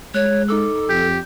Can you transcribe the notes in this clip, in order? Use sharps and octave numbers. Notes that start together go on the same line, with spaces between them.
G#3 C#5 F#6
D#4 A4 D6 E6
F2 G4 G6